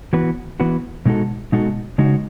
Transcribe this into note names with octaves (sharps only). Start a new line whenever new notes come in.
E3 B3 F#4 B4
E3 B3 F#4 B4
B2 G#3 D#4 F#4 A4
B2 G#3 D#4 F#4 A4
C#3 G#3 D#4 F#4